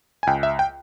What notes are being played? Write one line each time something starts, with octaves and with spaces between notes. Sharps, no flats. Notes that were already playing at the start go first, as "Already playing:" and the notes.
G#5
C#2 G5
E5
G5